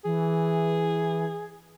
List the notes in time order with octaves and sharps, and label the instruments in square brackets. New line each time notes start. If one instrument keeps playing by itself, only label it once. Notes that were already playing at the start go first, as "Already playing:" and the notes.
[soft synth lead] E3 [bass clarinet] G#4